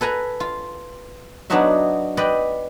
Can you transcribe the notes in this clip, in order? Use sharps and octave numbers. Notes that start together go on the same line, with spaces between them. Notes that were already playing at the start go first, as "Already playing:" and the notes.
A4 B4 G#5 A#5
F4
F#3 B3 D4 D#4 F#4 E5
B4 D5 D#5 G5